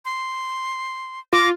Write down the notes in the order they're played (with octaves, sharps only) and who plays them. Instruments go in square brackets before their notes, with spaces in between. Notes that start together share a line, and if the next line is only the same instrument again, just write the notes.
[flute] C6
[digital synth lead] F4 [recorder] D6 [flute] A#6